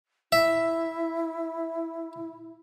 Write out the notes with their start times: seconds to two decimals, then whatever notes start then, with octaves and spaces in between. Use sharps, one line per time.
0.32 E4 E5